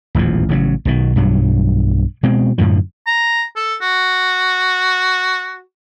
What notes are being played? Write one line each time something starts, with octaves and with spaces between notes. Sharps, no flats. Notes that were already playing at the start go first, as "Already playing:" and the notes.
D#1 A1 E2 F3
A1 C#3 E3 F#3
B1 B2 D#3
B1 G2 F#3
B2 G#3 C4
F#2 A2 D3 F3
A#5
A4
F#4